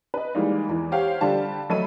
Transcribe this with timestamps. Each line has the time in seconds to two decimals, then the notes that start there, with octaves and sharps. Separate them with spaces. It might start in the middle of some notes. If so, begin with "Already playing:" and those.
0.14 B4 D#5
0.35 E3 G3 G#3 A#3 D#4
0.69 E2 E3
0.92 G4 C5 C#5 F5 F#5
1.21 D3 G3 F4 G4 A5
1.70 F#3 A3 A4 D#5 B5 D#7